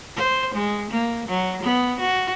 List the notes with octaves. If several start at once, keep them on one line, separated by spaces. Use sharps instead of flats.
C5
G#3
A#3
F#3
B3
F#4